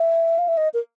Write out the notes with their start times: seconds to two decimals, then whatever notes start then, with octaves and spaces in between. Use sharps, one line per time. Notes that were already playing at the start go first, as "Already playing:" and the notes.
Already playing: E5
0.38 F5
0.48 E5
0.57 D#5
0.74 A#4